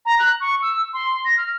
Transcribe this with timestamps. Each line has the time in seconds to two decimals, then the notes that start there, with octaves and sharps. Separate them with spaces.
0.06 A#5
0.19 F#6
0.41 C#6
0.62 E6
0.94 C6
1.25 A#6
1.37 F6